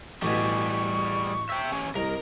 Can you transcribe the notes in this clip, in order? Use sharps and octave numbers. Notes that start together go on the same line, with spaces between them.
A1 B2 G3 G#4 C#6
E5 G5
C#4 G4
C2 A#4 D#5